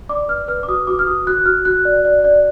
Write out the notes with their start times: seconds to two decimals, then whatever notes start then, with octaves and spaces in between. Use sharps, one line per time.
0.09 D5 D6
0.28 B4 F6
0.48 B4 F6
0.63 D6
0.68 F#4 D#6
0.87 F#4 D6
0.99 F6
1.07 F#4 D#6
1.27 F#4 F#6
1.46 F#4 F6
1.65 F#4 F#6
1.85 D5
2.05 D5
2.24 D5